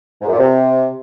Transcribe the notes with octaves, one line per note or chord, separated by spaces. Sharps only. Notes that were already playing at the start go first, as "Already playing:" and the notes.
G#2
F#2
A#2
C3